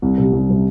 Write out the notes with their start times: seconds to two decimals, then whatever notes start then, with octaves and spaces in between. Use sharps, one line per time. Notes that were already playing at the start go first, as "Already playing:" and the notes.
0.02 C2
0.18 C3 G3
0.33 C2
0.49 C3 G3